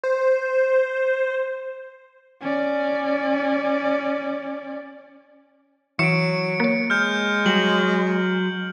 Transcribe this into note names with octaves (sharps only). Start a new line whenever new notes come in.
C5
C#4 D5
E3 F#3 C#6 C#7 D7 E7
A#3 C#5
G#3 F6 G6
F#3 G3 F#7